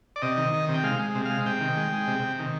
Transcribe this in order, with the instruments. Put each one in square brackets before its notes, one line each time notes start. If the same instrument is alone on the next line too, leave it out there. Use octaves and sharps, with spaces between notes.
[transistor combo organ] D5
C3 D#5
D#3
D#3
C3
G5
G#3 F5
G#3
C3
G#3 F5
C3 G5
D#3
G#3
G#3
C3
C3
D#3